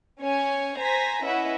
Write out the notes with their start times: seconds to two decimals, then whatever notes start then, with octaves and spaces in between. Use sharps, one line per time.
0.21 C#4 C#5 G#5
0.79 C5 G#5 A#5 A#6 B6
1.24 C#4 E4 B4 D#5 E5 F#5